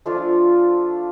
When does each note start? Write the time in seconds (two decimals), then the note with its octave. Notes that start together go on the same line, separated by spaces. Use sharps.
0.06 F3 A3 D4 F4